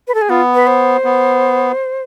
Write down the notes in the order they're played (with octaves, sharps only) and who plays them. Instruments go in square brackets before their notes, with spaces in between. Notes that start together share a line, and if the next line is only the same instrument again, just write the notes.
[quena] B4
A4
G#4
[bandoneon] B3 [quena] F4
[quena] B4
C5
[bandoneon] B3